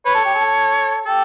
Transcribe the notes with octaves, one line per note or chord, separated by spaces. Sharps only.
B4 C#5
A4
G4
A4
G4 A4